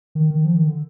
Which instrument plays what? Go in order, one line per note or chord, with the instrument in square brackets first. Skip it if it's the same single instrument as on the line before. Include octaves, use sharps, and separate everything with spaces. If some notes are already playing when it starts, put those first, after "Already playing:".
[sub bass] D#3
D#3
F3
D#3
D3